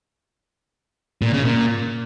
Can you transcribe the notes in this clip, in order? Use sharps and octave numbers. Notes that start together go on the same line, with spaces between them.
A#2
C#3
A#2